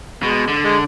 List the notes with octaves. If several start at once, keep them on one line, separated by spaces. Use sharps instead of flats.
B2 G#3
D3
G#3